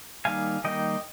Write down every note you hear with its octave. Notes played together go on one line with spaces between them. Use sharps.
D#3 G3 A#3 D#4 F5 G#5
D#3 G3 A#3 D#4 D#5 G5